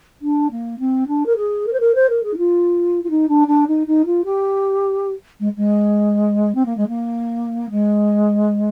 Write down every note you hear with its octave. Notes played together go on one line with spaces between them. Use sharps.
D4
A#3
C4
D4
A#4
G#4
A#4
C5
A#4
C5
A#4
G#4
D#4
F4
F4
D#4
D4
D4
D#4
D#4
F4
G4
G#3
G#3
C4
A#3
G#3
A#3
G#3